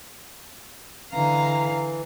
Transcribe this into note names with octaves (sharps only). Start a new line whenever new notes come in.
D3 E3 F5 A#5